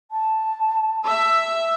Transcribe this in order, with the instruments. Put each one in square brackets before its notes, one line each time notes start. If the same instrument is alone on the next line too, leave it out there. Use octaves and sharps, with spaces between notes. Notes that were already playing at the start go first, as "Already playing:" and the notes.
[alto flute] A5
[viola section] E5